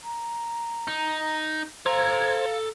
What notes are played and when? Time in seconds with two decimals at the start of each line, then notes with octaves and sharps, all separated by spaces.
0.04 A#5
0.88 D#4
1.86 A4 C5 F5 A#5 G#6